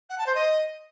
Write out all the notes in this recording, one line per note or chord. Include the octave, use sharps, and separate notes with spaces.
F#5
A5
C5
D#5